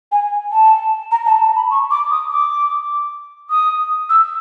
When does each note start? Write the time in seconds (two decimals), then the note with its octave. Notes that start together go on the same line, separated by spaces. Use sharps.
0.12 G#5
0.52 A5
1.11 A#5
1.26 A5
1.42 A5
1.56 B5
1.71 C#6
1.91 D6
2.11 D#6
2.31 D6
3.50 D#6
4.10 E6